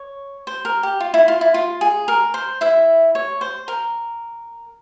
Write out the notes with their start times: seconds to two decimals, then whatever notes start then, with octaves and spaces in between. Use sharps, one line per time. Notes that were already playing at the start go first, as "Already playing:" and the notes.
Already playing: C#5
0.47 C5
0.65 A#4
0.83 G4
1.00 F4
1.14 E4
1.28 F4
1.41 E4
1.54 F4
1.81 G#4
2.08 A#4
2.34 C5
2.61 E4 E5
3.15 C#5
3.41 C5
3.68 A#4